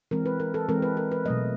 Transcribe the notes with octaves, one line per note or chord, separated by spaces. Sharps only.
E3 G#3 C4 A#4
B4
A#4
A4
E3 G#3 C4 A#4
B4
A#4
B4
B2 F#3 A3 D#5